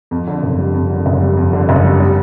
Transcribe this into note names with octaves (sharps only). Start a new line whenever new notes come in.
F2
D3
F#1
G3
F2
D3
F#1
G3
F2
D3
F#1
G3
G3